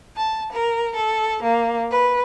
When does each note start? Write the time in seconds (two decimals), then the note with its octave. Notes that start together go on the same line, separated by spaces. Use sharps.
0.15 A5
0.52 A#4
0.94 A4
1.42 A#3
1.91 B4